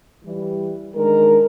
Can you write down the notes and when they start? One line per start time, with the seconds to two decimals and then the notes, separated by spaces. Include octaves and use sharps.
0.25 E3 G3
0.95 D#3 G#3 D4 A#4